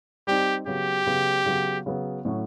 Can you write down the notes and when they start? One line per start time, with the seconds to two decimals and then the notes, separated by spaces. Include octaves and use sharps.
0.27 G3 C4 D#4 G4
0.67 C#3 F#3 B3 G4
1.07 C#3 F#3 B3
1.46 C#3 F#3 B3
1.86 C#3 F#3 B3
2.25 A2 F#3 A3 C#4 F#4